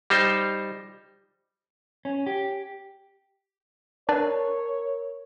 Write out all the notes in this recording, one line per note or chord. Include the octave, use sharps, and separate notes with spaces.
G3 D#4 C5
C#4
G4
D4 A#4 B4 C#5 D5